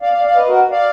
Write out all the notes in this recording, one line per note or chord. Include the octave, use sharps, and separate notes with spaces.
D5 F5
D5 F5
D5 F5
B4 D#5
F#4 A#4
D5 F5